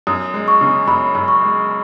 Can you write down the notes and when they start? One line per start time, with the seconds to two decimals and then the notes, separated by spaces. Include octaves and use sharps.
0.07 F#2 D#6
0.34 G#3
0.48 C#6
0.61 C#3
0.87 F#2 B5
1.15 F#2
1.28 C#6
1.42 G#3